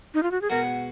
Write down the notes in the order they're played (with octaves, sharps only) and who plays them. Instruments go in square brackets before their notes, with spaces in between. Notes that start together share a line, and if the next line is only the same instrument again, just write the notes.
[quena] D#4
F4
F#4
G#4
[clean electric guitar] B2 G#3 B3 F#4 [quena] A#4